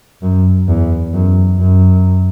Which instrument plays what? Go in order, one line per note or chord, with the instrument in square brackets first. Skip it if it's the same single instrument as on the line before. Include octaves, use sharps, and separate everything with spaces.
[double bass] F#2
E2
F#2
F#2